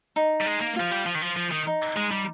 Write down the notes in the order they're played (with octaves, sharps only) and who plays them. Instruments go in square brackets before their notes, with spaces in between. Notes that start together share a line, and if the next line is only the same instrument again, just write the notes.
[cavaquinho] D#4
[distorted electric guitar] G3
G#3
A#3
[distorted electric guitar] F3 [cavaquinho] F4
[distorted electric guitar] G3
F3
D#3
F3
F3
D#3
[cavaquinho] D#4
[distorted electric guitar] G#3
G3